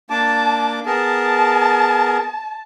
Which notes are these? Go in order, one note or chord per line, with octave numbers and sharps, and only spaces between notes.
A#3 D4 A5 D6
B3 G#4 A#4 A5